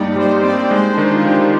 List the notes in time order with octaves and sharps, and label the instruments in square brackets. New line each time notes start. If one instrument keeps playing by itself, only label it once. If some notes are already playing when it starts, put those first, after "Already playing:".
Already playing: [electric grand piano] G2 G3 [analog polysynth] A#3 D#4 G4 D5
[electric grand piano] G3 [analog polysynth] C5
[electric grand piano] C4 [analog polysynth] D5
[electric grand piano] G#3 [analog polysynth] C5
[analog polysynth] D4
[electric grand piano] D#3 [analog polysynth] D#4
[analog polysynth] F4
[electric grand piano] D#3 [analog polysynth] G4